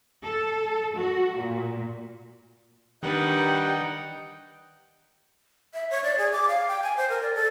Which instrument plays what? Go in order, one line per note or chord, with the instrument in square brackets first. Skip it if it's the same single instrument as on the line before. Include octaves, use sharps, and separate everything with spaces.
[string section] A4
F#4
A#2
[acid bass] D#3 [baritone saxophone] G3 [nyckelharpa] D4 B4 [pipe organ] D#4 F#5 G5
[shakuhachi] E5
C#5
D5
G#4
D6
F5
G5
G#5
C5
A#4
D5
A4